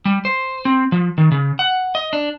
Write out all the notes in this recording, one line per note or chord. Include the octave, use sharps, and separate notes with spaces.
G3
C5
C4
F3
D#3
C#3
F#5
D#5
D4